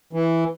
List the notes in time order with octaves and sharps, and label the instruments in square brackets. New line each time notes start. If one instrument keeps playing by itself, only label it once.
[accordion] E3